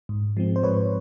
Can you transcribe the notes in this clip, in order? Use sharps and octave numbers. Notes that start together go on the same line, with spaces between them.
G#2
F3 G#3 C4
C5
G#2 B4 C#5